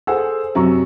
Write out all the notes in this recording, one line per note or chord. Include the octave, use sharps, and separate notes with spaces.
G#4 A4 C5 F#5 G#5 E6
F#2 C3 A#5 C#6